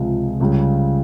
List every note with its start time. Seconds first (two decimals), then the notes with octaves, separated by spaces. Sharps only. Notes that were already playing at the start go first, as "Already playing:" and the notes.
Already playing: C#2 C3 F3 G#3
0.40 C#2 C#3 G3